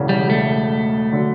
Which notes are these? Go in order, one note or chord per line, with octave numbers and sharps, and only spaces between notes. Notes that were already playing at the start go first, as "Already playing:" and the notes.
Already playing: E1 E2 C#3
G3
A3
D3 F#3